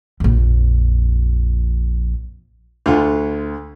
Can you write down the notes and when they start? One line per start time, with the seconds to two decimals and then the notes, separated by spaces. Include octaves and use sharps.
0.20 A#1 F2
2.86 D2 D3 F4